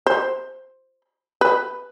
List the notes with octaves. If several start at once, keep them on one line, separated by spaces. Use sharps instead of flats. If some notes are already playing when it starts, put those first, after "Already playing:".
C5
B4